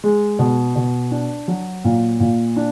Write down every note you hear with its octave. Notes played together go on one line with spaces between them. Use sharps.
G#3
B2
B2
D4
F#3
A#2
A#2
D4